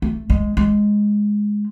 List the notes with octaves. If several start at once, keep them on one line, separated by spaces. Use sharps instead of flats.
A3
G#3
G#3